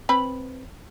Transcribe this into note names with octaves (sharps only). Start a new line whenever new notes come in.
C4 B4 B5